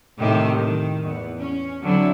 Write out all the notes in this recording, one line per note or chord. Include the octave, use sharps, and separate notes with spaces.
A2 C3 D#3 G4 C5
D#3
E2 B3
C#4
D3 F#3 C4 E4